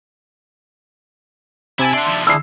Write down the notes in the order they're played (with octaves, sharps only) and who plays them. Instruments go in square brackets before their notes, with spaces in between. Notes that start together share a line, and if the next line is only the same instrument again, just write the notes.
[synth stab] C3 G#5 A5 [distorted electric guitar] E4
[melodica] D4 E5 [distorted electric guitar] D5 F#5 [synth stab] C6
[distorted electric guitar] D#2 F3
[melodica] D4 E4 G#4 [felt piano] E6 C7